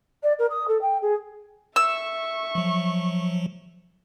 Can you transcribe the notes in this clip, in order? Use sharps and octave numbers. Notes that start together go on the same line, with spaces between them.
D5
A#4
D#6
A4
G5
G#4
E5 C#6 E6
F3 F#3